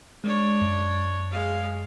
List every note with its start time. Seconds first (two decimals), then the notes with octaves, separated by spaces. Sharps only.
0.24 G#3 D4 C#5
0.61 F#2
1.31 G#3 F5